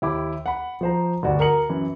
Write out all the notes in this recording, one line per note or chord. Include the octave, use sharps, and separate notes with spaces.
D#2 E4 G4 D6
F#5 B5
F3 C5 A#5
D2 G2 F#4 D5
A#4 A#5 D#6 C#7 F#7
F#2 E3